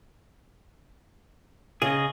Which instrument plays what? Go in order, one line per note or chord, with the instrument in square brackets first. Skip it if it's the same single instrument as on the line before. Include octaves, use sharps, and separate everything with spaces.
[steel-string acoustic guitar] C#3 [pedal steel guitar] G#4 D#5